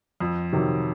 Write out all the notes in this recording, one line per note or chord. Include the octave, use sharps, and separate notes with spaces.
F2
C3 D#3 F#3